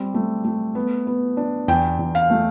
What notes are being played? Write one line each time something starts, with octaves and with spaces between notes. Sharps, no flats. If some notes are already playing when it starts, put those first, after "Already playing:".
Already playing: G3 C4
A3
A3
B3
B3
D4
E2 G5
E2
F5
A3